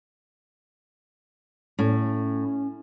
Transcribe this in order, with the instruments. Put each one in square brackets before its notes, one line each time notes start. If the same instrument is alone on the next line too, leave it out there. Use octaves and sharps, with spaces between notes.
[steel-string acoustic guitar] A2 [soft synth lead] C#4